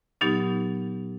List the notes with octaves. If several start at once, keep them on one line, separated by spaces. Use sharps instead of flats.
A#2 F#3 B3 D#4 G4